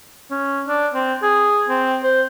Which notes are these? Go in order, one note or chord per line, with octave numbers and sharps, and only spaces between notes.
C#4
D4
C4
G#4
C4
C5